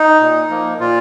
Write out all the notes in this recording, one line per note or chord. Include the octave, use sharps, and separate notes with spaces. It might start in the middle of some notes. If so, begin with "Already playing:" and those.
Already playing: D#4
A#2
F3 A#3
A#2 F4